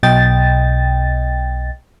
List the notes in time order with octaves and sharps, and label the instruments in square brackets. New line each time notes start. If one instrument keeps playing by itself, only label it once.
[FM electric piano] B1 B2 D#5 G5 A6